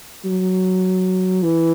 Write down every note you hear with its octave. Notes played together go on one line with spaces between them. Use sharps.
F#3
E3